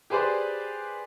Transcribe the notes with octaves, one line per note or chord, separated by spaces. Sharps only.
G4 G#4 B4 C5 D5